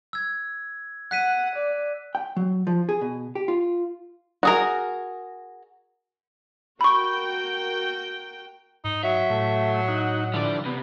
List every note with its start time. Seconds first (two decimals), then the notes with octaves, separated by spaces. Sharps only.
0.13 E6 G#6
1.11 F#5 F#6 B6 D#7
1.55 D5
2.15 G5
2.36 F#3
2.67 F3
2.89 G#4
3.01 B2
3.35 G4
3.48 F4
4.43 F#4 G#4 A#4
6.81 F#4 A#4 G5 B5 C#6
8.84 G#2 D#4
9.03 F#3 E5
9.30 A2 A3
9.88 D#4 F#5
10.34 D3 E3 F3 G3 D5
10.65 C3 B3